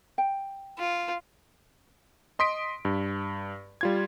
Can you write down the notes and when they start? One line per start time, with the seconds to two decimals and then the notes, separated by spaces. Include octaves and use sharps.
0.18 G5
0.78 F4
2.39 D#5 C6 D#6 B6 D7
2.85 G2
3.81 G3 F4 G#6